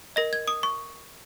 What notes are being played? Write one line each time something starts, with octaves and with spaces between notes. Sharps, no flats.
A#4 D#5 A#6
G#6
D#6
C#6